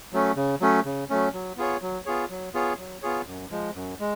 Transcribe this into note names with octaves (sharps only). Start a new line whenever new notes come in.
F#3 A3 C#4
C#3
F#3 A3 C#4
C#3
F#3 A3 C#4
F#3
B3 F4 G#4 C#5
F#3
B3 F4 G#4 C#5
F#3
B3 F4 G#4 C#5
F#3
B3 F4 G#4 C#5
F#2
F3 G#3
F#2
G#3